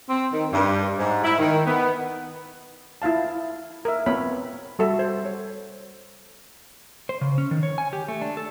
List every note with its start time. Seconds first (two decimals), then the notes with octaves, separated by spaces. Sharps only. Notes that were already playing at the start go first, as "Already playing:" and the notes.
0.09 C4
0.32 D#3
0.52 G2
0.98 G#2
1.24 E4
1.39 D#3
1.66 B3
3.02 E4 F4 F5 A5
3.85 A#4 E5
4.06 B3 C4 F4 C#5 B5
4.79 G3 F#4 A4 E5
4.99 C5
5.25 C#5
7.09 C5
7.21 C#3
7.38 C#4
7.51 D#3
7.63 C#5
7.78 G#5
7.93 G4
8.08 A3
8.22 D4
8.37 A4